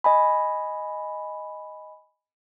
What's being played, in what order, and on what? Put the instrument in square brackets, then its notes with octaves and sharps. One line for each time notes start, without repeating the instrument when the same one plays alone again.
[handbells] D#5 G#5 B5